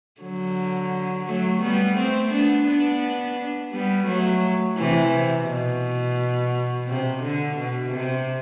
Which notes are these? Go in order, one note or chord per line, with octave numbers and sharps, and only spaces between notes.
D3 F#3
F#3 A3
G3 B3
A3 C4
B3 D4
B3 D4
G3 B3
F#3 A3
C3 E3
C3
B2
C3
D3
B2
C3